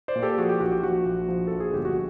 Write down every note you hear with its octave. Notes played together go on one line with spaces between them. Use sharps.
C5 D5
A#2
G4 A4
F3 F#4 G#4
G4
A#1 F#4
G4
F3 F#4
A#1
F3
A#1 A4
G#4
G1 G4
F#4